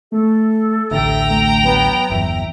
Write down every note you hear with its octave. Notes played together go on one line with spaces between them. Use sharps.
A3 A4
A1 D2 E5 G5 A#5
A3
F#3 B3
G1 E2 E5